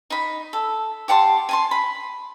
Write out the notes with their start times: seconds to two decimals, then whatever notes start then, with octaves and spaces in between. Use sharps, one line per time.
0.10 D#4 B5
0.53 A4
1.08 G4 F#5 A5 C6
1.49 G#5 A5 C6
1.71 B5